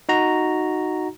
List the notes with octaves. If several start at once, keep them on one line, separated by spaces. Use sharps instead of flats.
D#4 F#4 A#5